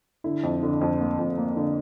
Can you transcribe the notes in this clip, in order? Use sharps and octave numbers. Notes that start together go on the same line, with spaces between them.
D3 E4
F2
D3
F2
A#3
F2
A#3
D3